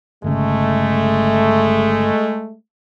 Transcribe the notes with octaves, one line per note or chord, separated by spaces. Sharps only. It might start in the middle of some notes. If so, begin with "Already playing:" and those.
G1 C#3 G#3 A3